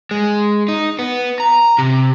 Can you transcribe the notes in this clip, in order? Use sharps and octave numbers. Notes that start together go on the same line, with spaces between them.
G#3
D#4
B3
A#5
C3